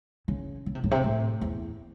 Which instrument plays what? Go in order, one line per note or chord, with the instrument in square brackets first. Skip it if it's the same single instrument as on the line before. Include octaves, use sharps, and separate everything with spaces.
[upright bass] C#3
C#3
C3
A2
C3
A2
E2